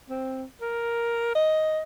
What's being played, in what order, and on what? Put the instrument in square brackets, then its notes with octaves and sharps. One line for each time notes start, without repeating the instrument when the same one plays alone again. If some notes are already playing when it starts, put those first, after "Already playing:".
[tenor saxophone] C4
A#4
D#5